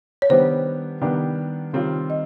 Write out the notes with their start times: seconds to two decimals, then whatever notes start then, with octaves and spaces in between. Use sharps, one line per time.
0.22 C#5
0.30 D#3 G3 B3 D4 G4 C5
1.01 D#3 G3 B3 D4 G4
1.73 D#3 G3 C4 F4 C#5
2.10 D#5